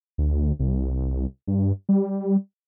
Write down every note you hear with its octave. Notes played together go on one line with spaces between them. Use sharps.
D2
C2
G2
G3